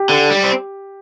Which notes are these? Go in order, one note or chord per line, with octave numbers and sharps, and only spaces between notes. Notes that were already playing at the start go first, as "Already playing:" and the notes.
Already playing: G4
D3
G3
C4